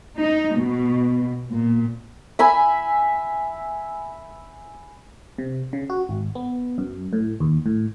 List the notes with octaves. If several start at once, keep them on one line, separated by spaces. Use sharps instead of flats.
D#4
B2
A#2
E5 G#5 B5
C3
C#3
F#4
G#1
B3
F#2
A2
D#2
A2